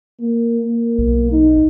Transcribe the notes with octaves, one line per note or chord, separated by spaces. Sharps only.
A#3
A#3
B1
D#4